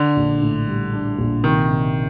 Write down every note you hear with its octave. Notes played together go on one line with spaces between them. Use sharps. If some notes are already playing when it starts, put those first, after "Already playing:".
Already playing: D3 D4
A#1
A2
G3
D4
A#1
C3 D#3
C3